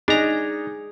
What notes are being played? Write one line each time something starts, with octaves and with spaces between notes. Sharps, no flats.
D4 D#4 G#4 A#5